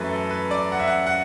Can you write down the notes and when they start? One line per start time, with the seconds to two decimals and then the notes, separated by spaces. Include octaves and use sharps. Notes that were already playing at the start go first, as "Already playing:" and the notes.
Already playing: F#2 E3 A3 B4
0.09 A4
0.30 B4
0.51 D5
0.72 F#5
0.80 E5
0.87 F#5
1.06 F#5